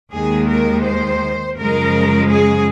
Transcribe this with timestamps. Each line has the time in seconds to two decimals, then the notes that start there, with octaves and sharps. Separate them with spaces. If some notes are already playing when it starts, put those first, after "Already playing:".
0.13 D#2 D#3 G#3 G#4
0.49 A#4
0.85 C5
1.57 F#2 C#3 F3 G#3 A#4
2.28 G#4